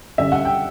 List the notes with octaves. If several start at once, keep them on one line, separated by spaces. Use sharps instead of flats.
F#2 D3 G3 C#4 E5
F#5
G5